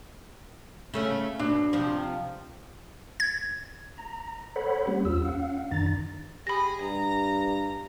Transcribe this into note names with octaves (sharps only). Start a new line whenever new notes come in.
C#3 A3 C#4
B2 D4
C3 F3
G#6
A#5
A4 C5 C#5 F#5 B5
G3 A#3 C#4 G4
E2 F4 E6
C#4 F5 F#5
F#2 D#3 D4 A#5 A6
G4 G#4 B5 A#6
G2 A#5